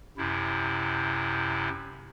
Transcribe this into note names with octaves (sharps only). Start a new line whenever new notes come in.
F#2 C3 E4